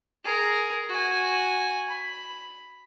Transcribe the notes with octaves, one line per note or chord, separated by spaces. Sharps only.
G#4 A#4
F#4 G#5
B5